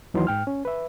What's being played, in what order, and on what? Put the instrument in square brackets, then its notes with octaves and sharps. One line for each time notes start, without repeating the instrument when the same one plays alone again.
[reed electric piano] D#2 E3 F#3 D#4 E4 C6
G#2 G5 F6
C#4
B4 E5